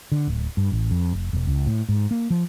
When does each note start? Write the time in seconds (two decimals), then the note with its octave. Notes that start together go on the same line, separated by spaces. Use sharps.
0.12 D3
0.27 D1
0.57 G2
0.72 A1
0.91 F2
1.13 F1
1.33 E1
1.47 C#2
1.66 A2
1.89 G#2
2.11 A#3
2.30 F3